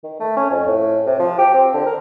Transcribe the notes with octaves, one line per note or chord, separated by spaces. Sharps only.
D#3
A3
C#4
F2
A2
C3
F3
G4
C4
D3
A#4